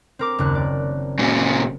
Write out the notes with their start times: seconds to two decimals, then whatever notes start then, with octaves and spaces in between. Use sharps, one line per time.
0.19 C4 A#4 D6
0.38 F#1 D#2 F#6
0.55 D5
1.19 A#2 C#3